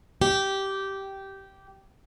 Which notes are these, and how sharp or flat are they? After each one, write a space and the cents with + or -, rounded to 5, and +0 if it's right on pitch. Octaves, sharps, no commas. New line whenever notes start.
G4 -10